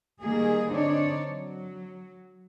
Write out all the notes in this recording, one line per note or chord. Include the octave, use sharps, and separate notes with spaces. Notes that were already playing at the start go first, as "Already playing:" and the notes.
D#3 G3 A#3 G#4
D3 C4 D4 D#4 C#5 D5
F#3